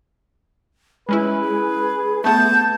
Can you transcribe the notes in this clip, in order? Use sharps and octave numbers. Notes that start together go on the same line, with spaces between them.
G#3 C#4 E4 B4 B5
G#4
A3 B3 A5 G6